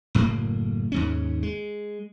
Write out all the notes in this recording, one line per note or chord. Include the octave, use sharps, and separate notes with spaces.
F#1 F#2 A2 A#3
D#2 G#2 C#4
G#3